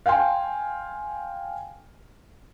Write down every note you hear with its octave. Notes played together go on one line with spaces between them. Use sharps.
F5 G5 G#5 C6